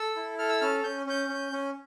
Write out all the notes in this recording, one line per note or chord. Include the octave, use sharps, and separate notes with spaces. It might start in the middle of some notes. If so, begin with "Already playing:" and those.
Already playing: A4 E6
E4
A4 F6
E6
C#4 F6
C#4 G6
C#4 G6
C#4
C#4